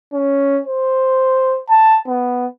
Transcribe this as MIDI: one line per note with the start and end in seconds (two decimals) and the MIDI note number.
0.14 0.60 61
0.67 1.59 72
1.69 2.00 81
2.08 2.47 59